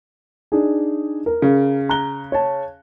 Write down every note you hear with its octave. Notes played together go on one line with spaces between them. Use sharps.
D4 D#4 G#4
A#4
C#3
A#5 F#6 G7
C#5 A5